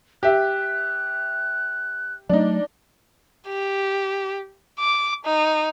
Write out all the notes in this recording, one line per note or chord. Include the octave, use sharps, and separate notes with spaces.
G4 E5 F#6
F#3 A3 D4 D#4
G4
D6
D#4